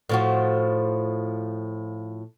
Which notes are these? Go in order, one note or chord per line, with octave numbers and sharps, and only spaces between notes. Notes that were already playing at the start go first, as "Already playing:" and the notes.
A2 F3 F#4